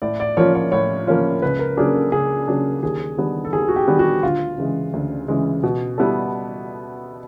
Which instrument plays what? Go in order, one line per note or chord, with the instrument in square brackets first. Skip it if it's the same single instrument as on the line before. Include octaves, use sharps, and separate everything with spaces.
[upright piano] A2 [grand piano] D5
[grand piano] D5
[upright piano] F3 A#3 C#4 F4 [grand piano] C#5
[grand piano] C#5
[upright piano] A2 [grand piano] C#5
[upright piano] F3 A#3 C#4 F4
[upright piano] C#2 [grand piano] B4
[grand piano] A#4
[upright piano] C#3 F#3 A#3 D4 [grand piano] G#4
[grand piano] A4
[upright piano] C#2 [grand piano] G#4
[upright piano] C#3 F#3 A#3 D4
[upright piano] D#2 [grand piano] G#4
[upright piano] D#3 G3 B3 D4
[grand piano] A4
[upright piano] D#2 [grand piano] G#4
[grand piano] F#4
G4
[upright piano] D#3 G3 B3 D4
[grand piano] F#4
[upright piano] D2 [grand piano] F4
[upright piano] C#3 E3 G#3
D2
C#3 E3 G#3
B2
G3 B3 E4 A4